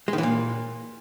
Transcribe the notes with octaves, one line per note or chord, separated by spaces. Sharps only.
G#3
D#3
E3
A#2